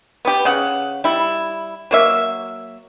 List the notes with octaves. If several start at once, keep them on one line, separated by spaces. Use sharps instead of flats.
B3 G4
C#3 F#5
G3 E4
F#3 A#3 E5